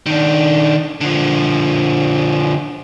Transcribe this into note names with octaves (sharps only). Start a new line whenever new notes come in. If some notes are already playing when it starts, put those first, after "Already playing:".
D#3 D4
D3 F3